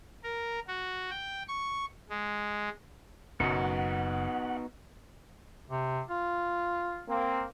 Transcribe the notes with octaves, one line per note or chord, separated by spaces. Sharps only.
A#4
F#4
G5
C#6
G#3
F#1 F#2 B2 B3 D#4 F#4 F#5
C3
F4
A#3 C4